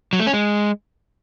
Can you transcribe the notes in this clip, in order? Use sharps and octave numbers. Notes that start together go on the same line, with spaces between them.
F#3
A3
C#4
G#3